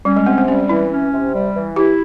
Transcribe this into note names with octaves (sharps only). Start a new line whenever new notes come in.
G3 C#4
G#3
C3 C4
C4
G3 C#4
E3 E4
C#4
C3
G3
E3
E4 G4